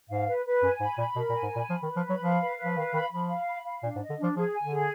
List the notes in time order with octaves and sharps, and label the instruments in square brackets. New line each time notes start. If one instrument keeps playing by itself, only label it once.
[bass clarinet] G#2 [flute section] F5
[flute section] B4
B4
[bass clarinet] F#2 [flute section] G#5
[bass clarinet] G#2 [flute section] B5
[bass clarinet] A#2 [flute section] B5
[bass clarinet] B2 [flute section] A#4
[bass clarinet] A#2
[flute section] G#5
[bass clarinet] G#2
[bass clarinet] A#2 [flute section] B5
[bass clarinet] F3 [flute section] B5
[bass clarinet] D#3
[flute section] B4
[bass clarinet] F3
[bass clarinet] F#3 [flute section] B5
[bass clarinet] F3 [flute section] F5
[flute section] B4
B4
[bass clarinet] F3
[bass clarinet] D#3 [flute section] F5
[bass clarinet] D#3 [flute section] B5
[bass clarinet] F3 [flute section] B5
[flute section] F5
B5
F5
[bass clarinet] A#2 [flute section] D4
[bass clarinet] G#2
[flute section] D#5
[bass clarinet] D3
[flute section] D4
[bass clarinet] F3
[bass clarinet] F3 [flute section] G#4
[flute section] G#5
[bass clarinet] D3
[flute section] G#4